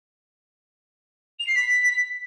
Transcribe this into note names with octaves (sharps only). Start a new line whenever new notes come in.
F7
C7
B6